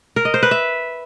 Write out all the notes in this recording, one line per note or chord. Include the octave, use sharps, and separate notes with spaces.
A#4
D#5
C5
B4
E5